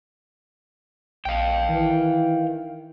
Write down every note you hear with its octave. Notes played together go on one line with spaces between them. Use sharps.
A#1 F5 G5
D#3 E3